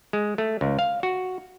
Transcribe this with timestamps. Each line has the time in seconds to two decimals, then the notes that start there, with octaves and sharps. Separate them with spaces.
0.13 G#3
0.38 A3
0.61 C#2
0.79 F5
1.03 F#4